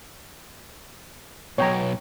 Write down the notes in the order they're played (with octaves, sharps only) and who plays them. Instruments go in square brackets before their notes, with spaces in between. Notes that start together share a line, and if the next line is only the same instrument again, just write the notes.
[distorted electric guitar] B1 B2 [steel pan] C#5 G5 A#5